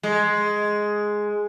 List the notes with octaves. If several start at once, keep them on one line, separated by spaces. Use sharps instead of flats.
G#3